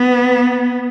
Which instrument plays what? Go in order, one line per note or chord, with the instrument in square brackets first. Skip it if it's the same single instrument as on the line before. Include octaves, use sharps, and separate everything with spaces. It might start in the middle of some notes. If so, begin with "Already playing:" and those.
Already playing: [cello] B3